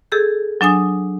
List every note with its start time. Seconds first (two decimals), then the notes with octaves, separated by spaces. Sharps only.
0.12 G#4 A4 E6 G6
0.61 F#3 D4 G#5 D#6